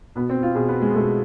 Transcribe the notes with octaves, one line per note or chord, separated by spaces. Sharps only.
B2 B3
C4
F4
B2 G#4
B3
G#3
B2 A3